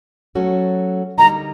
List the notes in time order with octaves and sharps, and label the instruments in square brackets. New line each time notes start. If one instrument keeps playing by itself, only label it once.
[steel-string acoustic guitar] F#3 A3 C#4 F#4 A4
[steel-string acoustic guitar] D3 G3 A#3 D#4 [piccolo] A#5